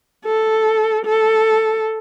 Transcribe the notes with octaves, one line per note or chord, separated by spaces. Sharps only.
A4
A4